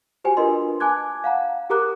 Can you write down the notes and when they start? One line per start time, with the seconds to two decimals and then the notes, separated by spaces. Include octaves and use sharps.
0.24 F#4 G4 C5 G5 G#5
0.37 D4 F4 A#4 B4 D#5 C6
0.80 G#5 A5 D6 F#6 G#6
1.24 F5 F#5 A#5
1.70 G4 G#4 A#4 A#5 D6 F#6